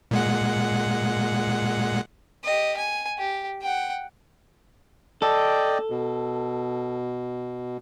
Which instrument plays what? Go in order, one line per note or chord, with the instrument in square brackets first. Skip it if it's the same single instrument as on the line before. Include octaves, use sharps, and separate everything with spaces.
[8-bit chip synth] A#2 G#3 F#5
[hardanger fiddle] G4 D#5
G#5
G4
F#5 G5
[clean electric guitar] A4 [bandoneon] D5 D#5 G5
[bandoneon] B2